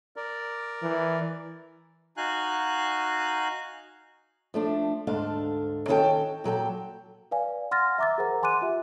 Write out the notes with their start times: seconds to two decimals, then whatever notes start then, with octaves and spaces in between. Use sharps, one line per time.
0.16 A#4 D5
0.83 E3
2.17 D#4 F#4 F5 G#5 F#6
4.54 F3 A3 D4
5.07 D2 G#2 D4 A4 F5
5.88 D#3 C#4 E4 F#4 A4 G5
6.44 A#2 F#3 A4 G5
7.31 B4 D5 F5 G#5
7.71 F#5 C6 F6 A6 A#6
7.99 E5 A#5 D6 E6 A6
8.18 G#4 A#4 C5 F#5 A#5
8.42 F#5 G#5 C6 D6 F#6 D#7
8.62 F4 G4 E5